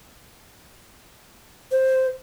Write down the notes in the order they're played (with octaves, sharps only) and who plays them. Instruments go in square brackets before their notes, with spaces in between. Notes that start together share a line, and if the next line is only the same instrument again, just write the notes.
[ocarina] C5